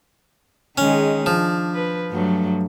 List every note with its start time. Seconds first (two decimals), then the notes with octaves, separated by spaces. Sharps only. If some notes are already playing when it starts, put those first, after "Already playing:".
0.78 D#3 G#3 C#4 G#4
1.26 F3 D4
1.74 B4
2.11 G2 F#3 A3